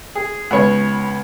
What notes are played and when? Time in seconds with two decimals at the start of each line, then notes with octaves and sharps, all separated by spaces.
0.15 G#4
0.51 C#2 B3 C#5